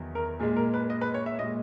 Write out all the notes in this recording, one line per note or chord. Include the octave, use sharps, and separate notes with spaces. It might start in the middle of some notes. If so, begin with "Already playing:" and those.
Already playing: E2 D#3 F#3
A#4
A#2 G#3 G#4
A#4
B4
D#5
B4
C#5
E5
A#2 G#3 D#5